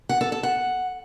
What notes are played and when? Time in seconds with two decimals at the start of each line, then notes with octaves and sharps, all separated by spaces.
0.09 F#5
0.21 A4
0.32 A4
0.43 F#5